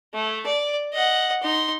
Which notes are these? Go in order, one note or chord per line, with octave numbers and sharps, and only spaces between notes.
A3
D5
D#5 F#5
D#4 C6